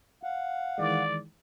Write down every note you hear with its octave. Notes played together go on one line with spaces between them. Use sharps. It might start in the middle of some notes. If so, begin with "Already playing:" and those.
F5 F#5
D#3 E3 G#3 D5